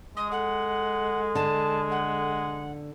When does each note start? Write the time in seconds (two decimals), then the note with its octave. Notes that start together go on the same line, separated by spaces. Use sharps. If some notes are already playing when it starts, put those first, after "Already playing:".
0.17 G#3 D#5 D#6
0.32 A4 F#5
1.35 D3 A5
1.91 F#5